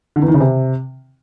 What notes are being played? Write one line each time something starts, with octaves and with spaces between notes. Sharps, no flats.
D3
E2
D#3
C#3
C3